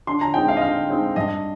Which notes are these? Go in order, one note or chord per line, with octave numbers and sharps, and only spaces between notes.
D3 C6
A#5
G#3 C4 D#4 G5
F5
D#5
D3 F5
G#3 C4 D#4
G2 D#5